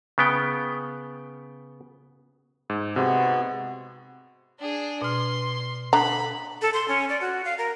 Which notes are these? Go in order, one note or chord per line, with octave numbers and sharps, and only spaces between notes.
C#3 B3 G5
G#2
C3 G#3 B3 F#4
D4 G#4
B2 C6 F6
D3 A#5 B5
A4
C6
C#4
D5
F#4
F5
A#4